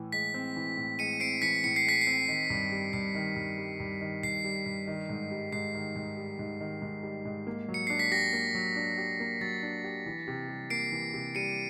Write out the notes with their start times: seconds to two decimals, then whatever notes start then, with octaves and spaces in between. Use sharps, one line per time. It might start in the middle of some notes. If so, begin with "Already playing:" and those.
Already playing: A2 E3
0.12 G#3 B6
0.34 C4
0.56 E3
0.77 A2
0.99 G#3 C#7 D#7
1.20 C4 C7 D7
1.42 E3 B6 C#7
1.64 A2 C#7
1.76 C7
1.86 G#3 B6
2.01 C7
2.07 C4
2.28 D#3
2.50 G2
2.72 G3
2.93 G2 C7
3.15 D#3
3.36 G2
3.58 G3
3.80 G2
4.01 D#3
4.23 G2 C7
4.44 G3
4.66 G2
4.88 D#3
5.09 G#2
5.31 G3
5.53 G#2 C7
5.74 D#3
5.96 G#2
6.17 G3
6.39 G#2
6.60 D#3
6.82 G#2
7.03 G3
7.25 G#2
7.47 A#3
7.68 F#3
7.74 C#7
7.87 D4 C7
7.99 B6
8.11 G4 A#6
8.33 A#3
8.55 F#3
8.76 D4
8.98 G4
9.20 A#3
9.41 F#3 A6
9.63 D4
9.84 G4
10.06 E3
10.27 C3
10.49 G3
10.70 A#3 C7 D7
10.92 E3
11.14 C3
11.35 G3 C#7 D#7